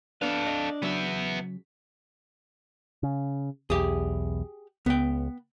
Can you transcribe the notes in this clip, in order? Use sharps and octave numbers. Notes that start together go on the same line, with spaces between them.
B3 D4 A4 B4 F5
D#5
C#3 F#3 B3 E5
C#3
B1 E2 G4 G#4
C#2 B3 G5